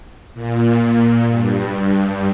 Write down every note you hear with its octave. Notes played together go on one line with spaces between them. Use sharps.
A#2
G2